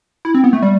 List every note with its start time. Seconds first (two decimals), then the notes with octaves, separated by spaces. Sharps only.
0.25 E4
0.35 C4
0.44 B3
0.53 A3
0.62 G3